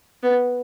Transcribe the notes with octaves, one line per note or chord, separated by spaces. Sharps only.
B3